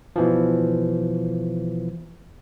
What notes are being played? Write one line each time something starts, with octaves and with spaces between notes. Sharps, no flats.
B2 E3 F3